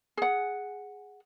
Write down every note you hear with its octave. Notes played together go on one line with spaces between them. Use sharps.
G#4 F#5